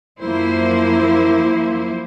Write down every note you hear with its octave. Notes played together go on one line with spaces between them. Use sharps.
F#2 F3 A#3 E4 C5